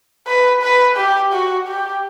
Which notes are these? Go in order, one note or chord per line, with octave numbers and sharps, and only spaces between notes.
B4
B4
G4
F#4
G4